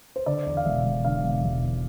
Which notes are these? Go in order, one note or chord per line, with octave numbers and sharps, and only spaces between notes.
C5
D3 D5
E2
F5
E1 E5
E1
D3 F5
E1
E1
E2